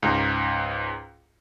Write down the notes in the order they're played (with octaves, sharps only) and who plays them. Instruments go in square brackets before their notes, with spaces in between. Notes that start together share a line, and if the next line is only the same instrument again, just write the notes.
[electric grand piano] C#2 G#2 A#5